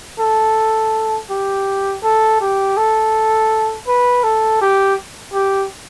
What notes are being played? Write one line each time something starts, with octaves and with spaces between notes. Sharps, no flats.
A4
G4
A4
G4
A4
B4
A4
G4
G4